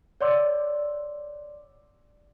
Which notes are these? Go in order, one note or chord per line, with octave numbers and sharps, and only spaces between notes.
C#5 D5 F#5 C6 D6 E6